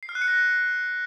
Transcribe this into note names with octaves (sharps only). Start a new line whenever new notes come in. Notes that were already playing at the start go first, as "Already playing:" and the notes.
C7
F6
F#6
C#7
A#6